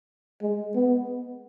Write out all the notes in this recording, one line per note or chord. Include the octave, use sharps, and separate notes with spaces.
G#3
B3